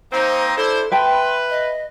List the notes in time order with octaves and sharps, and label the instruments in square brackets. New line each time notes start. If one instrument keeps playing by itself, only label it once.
[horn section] A#3 C4 D#4 [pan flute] C5
[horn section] D4 E4 C5 [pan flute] A4
[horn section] B4 [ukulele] E5 G5 A5 [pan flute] C6
[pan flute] D#5